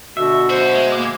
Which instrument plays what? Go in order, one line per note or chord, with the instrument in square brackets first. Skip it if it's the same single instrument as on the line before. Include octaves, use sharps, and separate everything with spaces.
[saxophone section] B2 D3 [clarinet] F#4 [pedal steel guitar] E5
[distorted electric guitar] F#2 F#4 [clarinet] C5
[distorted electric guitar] G#3
[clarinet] A#3 [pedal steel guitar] D6